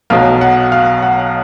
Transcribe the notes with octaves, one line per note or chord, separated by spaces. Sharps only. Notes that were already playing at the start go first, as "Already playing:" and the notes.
B1 B2 F#3 F5
F#5
F5
F#5